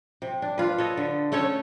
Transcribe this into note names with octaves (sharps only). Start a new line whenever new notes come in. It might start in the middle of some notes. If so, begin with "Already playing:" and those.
C3
D4
F4 B4
A4 C#5 D#5
D3
A3 C#4 A4 C#5